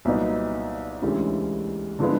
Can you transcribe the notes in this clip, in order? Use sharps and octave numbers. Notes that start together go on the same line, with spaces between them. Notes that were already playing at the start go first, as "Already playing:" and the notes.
C2 A#2 F#3 B3 D#4
D2 C3 E3 G#3 C#4
D3 F3 G#3 B3 E4